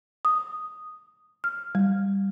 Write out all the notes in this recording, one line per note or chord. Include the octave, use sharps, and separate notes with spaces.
D#6
F6
G3